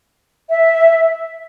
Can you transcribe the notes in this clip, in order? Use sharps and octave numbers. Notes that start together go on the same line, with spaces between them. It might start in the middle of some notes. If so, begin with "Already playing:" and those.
E5